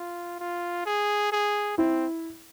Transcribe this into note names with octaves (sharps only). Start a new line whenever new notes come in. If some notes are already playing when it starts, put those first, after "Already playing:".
Already playing: F4
F4
G#4
G#4
C4 E4